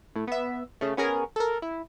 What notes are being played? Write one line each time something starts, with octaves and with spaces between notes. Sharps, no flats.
A2
B3 E5
C#3 A3
B3 C#4 G#4 A#4
A4 A#4
E4